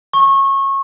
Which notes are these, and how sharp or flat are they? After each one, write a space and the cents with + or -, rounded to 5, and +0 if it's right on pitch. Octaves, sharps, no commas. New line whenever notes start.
C#6 -25